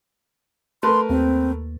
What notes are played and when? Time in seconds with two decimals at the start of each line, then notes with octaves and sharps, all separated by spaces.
0.83 A3 A#4 B4 C6
1.10 D#2 C4